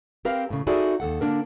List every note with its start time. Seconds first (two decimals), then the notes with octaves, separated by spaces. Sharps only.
0.25 C4 G4 A#4 B4 F5
0.50 A2 C#3
0.67 D#4 E4 F#4 G#4 A4 D5
1.00 D#2 A4 F#5
1.21 D3 A#3 D4 A#4